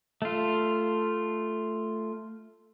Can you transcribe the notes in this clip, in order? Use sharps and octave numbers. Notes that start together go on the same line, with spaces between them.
A3 F4